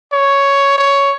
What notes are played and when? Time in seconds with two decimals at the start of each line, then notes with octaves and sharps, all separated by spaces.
0.12 C#5
0.78 C#5